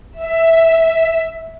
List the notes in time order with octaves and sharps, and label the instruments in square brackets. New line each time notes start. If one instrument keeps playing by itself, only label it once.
[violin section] E5